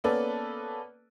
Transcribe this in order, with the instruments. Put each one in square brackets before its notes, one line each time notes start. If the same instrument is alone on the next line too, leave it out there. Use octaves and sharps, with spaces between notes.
[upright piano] A#3 B3 C#4 A4 B4 D5